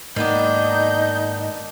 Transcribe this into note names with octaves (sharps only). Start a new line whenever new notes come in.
G#2 D#3 A#3 B3 D4 D#4 G6